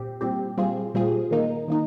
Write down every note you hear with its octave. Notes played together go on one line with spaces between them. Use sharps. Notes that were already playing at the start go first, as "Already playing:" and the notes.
Already playing: A#2 G3 C4 G4
A#2 G3 C4 G4
A#2 G3 C4 F4 G#4
A#2 G3 C4 F4 G#4
D#3 A#3 D#4
D#3 A#3 D#4